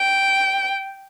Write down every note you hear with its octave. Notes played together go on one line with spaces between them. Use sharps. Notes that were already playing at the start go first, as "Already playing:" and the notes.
Already playing: G5